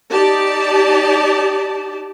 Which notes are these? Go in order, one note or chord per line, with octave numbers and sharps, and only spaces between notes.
D#4 G4 D5 A5